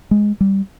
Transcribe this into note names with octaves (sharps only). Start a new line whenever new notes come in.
G#3
G3